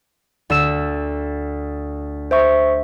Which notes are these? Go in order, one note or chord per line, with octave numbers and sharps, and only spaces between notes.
D2 E6 E7
C5 E5 C#6